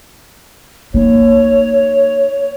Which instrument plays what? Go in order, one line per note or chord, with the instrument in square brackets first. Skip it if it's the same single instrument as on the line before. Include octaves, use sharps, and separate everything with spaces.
[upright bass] A#3 D#4 [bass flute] C#5